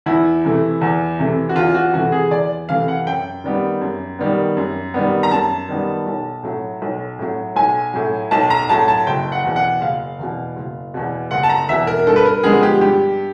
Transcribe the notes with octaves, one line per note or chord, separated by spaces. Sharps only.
E2 E4
C3 E3 A3
E2
C3 E3 A3
F#4
E2 F4
F#4
C3 E3 A3 F#4
G#4
E2 D5
C3 E3 A3 F5
F#5
F#2 G5
D#3 G3 B3
F#2
D#3 G3 B3
F#2
D#3 G3 B3
A#5
F#2 A5
D#3 G3 B3
B1
A2 F#3
B1
A2 F#3
B1 G#5
A2 F#3
B1 A5
A#5
A2 F#3 A5
A5
F#1 G5
F#5
E2 B2
F#5
F#1 F5
E2 B2
F#1
E2 B2
F#1 F#5
A5
A#5
E2 B2 E5
A#4
G2 A4
B4
A#4
D3 F3 G#3 B3 G#4
G4
G2 G4